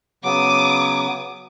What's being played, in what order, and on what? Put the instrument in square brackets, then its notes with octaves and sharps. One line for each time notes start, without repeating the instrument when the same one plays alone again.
[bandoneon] C#3 F#3 B3 [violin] D6 D#6